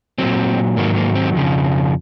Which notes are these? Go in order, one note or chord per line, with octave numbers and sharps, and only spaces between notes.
A#2 F#3 C4
G#2 D#3 F#3 A#3
A#3
C4
F2 C#3 F3